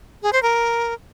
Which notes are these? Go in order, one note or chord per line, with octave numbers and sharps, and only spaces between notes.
G#4
C5
A#4